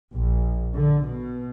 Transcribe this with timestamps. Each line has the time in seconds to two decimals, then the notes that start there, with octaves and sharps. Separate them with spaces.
0.13 A#1
0.74 D3
1.03 B2